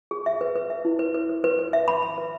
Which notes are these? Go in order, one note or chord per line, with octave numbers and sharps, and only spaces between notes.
G#4
E5
B4
B4
E5
E4
B4
B4
B4
B4
B4
E5
B5
B5
B4